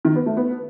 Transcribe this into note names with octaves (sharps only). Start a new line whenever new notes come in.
D#3
B3
A3
B3